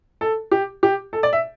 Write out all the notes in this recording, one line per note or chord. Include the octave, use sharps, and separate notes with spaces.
A4
G4
G4
A4
D5
E5